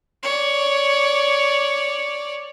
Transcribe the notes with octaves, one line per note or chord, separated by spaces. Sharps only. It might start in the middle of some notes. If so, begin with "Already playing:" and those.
C#5 D5